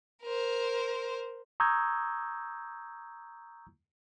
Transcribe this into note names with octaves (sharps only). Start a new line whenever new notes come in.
A#4 C5
A#5 C#6 D#6 E6 G6 G#6